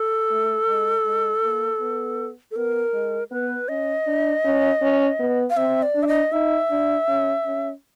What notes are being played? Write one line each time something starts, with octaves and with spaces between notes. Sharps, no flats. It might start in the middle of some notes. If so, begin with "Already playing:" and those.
Already playing: A4
A3
G#3
G#3
A#3
B3
A4
B3 A#4
G#3
B3 B4
C#4 D#5
D4
C#4
C#4
B3
F5
C4 E5
D5
D4
E5
D#5
D#4 E5
D4
C#4
C#4